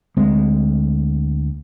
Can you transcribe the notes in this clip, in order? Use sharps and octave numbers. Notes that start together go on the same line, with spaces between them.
D2 G#3 C4